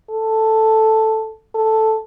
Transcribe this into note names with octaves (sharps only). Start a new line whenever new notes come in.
A4
A4